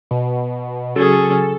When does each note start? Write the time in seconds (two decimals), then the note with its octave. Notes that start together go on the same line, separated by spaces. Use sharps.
0.11 B2
0.96 C#3 F#3 C#4 G#4 A4